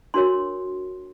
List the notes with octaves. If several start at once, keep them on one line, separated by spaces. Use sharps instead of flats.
D4 F#4 A#4 C#5 C6